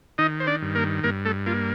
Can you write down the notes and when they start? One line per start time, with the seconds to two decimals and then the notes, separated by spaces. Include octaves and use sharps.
0.18 D#3 D#4 D#5
0.40 C5
0.47 D4 D5
0.62 G2
0.75 A#3 A#4
1.03 G2 A#3 A#4
1.25 A3 A4
1.46 A#3 F4